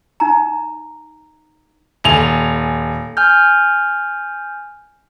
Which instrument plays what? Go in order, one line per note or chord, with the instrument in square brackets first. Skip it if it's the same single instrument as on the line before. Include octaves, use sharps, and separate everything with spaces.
[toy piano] D#4 A#5
[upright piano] D#1 G#5 F7
[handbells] G#5 F6 G6